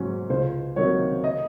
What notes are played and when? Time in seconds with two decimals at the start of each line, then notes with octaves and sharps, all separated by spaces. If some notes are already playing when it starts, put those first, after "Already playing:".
Already playing: G#2 F#3 C#4
0.30 C#2 C5
0.76 C3 D#3 F#3 C#5
1.24 D#5